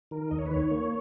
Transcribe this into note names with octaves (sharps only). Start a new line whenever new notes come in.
D#3 A#4
D#2 D#5
C#5
B4
D#3 C#5
A#3